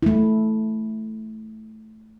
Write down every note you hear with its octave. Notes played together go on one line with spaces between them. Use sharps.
A3 E4